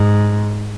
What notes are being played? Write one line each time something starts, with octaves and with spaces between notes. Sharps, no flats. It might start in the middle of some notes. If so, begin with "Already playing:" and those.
Already playing: G#2